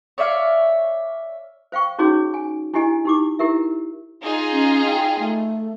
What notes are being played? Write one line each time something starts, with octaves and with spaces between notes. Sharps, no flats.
C#5 D5 E5 F5
C5 F5 G5 C#6
C#4 D#4 F#4 G#4 C#5
G#5
D4 E4 G4 D#5 G#5
D#4 G4 D6
E4 G4 A#4 E5
D#4 F4 G#4
C#4
G5
A3